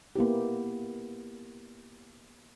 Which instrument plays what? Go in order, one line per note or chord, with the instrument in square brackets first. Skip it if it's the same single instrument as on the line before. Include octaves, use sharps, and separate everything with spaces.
[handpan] A#3 B3 E4 G4